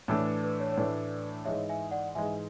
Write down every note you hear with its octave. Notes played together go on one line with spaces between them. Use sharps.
A2 E3 A3 D4 C#5
B4
B4
C#5
C#5
A2 E3 A3 D4 B4 D5
G#2 E3 G#3 C#5 E5
E5 G#5
D5 F#5
G#2 E3 G#3 E5 G#5